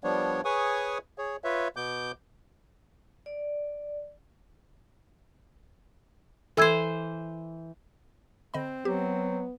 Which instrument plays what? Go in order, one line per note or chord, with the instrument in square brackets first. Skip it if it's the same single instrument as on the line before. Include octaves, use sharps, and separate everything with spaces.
[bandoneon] F3 G3 B3 D4 C#5
G#4 B4 C#5 G#5 C#6 D#6
G#4 C#5
F4 B4 C#5 E5
B2 B3 D6 G6
[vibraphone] D5
[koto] E3 C5 [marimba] A4 E6 G#6
[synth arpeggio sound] D3 D#5 B5 [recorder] C4
[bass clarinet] F#3 [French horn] B3 [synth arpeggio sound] G4